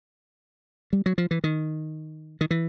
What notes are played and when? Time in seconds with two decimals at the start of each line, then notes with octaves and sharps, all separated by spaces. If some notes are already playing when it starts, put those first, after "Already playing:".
0.93 G3
1.06 F#3
1.18 F3
1.31 E3
1.44 D#3
2.41 D#3
2.51 E3